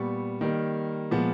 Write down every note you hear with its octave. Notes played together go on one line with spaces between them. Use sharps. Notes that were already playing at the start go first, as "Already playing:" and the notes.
Already playing: A#2 G3 B3 C#6
D#3 G3 A#3
A#2 F3 G#3 B3